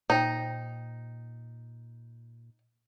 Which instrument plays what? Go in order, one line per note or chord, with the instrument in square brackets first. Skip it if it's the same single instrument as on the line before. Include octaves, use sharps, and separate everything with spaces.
[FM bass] A#2 [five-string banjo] D#4 [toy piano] C5 G5